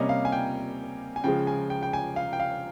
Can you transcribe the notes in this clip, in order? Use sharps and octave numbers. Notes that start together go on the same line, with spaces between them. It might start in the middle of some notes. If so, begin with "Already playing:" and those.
Already playing: C3 G3 A#3 C#4 D#5
F5
G#5
G5
G#5
C#3 F3 G#3 G5
G#5
G5
G5
G#5
F5
G5
F5